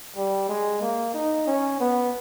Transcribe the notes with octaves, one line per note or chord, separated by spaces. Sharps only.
G3
G#3
A#3
D#4
C#4
B3